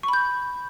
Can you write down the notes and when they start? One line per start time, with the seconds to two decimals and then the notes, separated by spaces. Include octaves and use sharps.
0.03 C#6
0.08 B5
0.13 G6